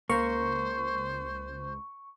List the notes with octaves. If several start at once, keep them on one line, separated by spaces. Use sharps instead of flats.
C#2 A#3 C5 C#6